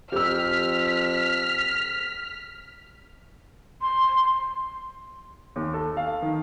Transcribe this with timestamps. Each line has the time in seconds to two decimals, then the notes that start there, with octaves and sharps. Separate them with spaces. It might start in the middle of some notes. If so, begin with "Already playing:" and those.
0.12 F2 G4 E6 F6 B6
3.82 C6
5.56 D#2
5.74 A4
5.97 F5
6.22 D#3